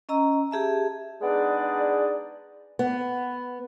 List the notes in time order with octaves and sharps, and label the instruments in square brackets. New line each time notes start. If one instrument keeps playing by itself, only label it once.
[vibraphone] C#4 D#5 A#5 E6
G4 G#4 E5 A5
[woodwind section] G#3 B3 D4 D#4 G#4 D5
[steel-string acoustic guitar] B3